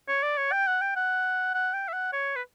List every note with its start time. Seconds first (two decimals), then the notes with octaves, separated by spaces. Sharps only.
0.09 C#5
0.23 D5
0.37 C#5
0.52 G5
0.67 F#5
0.81 G5
0.96 F#5
1.54 F#5
1.74 G5
1.88 E5
1.93 F#5
2.13 C#5
2.36 B4